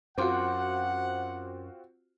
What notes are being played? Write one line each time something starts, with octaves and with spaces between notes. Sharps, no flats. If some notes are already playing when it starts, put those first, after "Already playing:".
F#2 C4 F4 F#4 F#5 C6 D6 G6